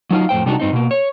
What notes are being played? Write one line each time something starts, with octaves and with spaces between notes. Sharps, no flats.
F#3 D#4 F4 F5
F2 A2 C5 G5
C3 G3 G#3 D4 D#4 F#4
G2 C4 D#4
B2 A#3
C#5